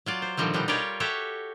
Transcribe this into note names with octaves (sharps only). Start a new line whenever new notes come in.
F#3 F4 D5
C5
A#2 D3 D#3 F3 G3 C4
B2 G3 D4 D#4
G3 F4 G4 A#4 C#5 D5
F#4 G4 A4 C#5 E5 F#5